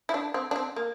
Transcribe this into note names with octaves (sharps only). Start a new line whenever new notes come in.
E4
D4
C4
D4
C4
A#3